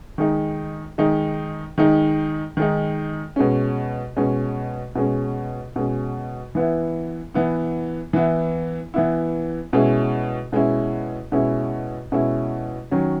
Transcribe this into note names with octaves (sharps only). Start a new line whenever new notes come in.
D#3 G#3 D#4
D#3 G#3 D#4
D#3 G#3 D#4
D#3 G#3 D#4
B2 G#3 C#4
B2 G#3 C#4
B2 G#3 C#4
B2 G#3 C#4
E3 B3 E4
E3 B3 E4
E3 B3 E4
E3 B3 E4
B2 G#3 C#4 E4
B2 G#3 C#4 E4
B2 G#3 C#4 E4
B2 G#3 C#4 E4
D#3 F#3 C#4